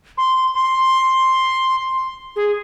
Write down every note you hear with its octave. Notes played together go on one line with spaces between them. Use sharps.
C6
C6
G#4